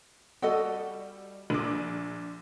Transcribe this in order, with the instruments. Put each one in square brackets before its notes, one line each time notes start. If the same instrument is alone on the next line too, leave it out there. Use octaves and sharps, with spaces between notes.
[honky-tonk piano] G3 [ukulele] F#4 A4 D#5
[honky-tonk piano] A#1 D6